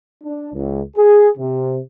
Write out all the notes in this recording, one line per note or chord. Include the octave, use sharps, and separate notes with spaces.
D4
C#2
G#4
C3